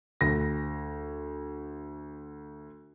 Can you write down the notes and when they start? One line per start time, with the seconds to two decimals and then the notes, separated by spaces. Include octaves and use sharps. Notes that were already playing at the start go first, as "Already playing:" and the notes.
0.21 D2 A#6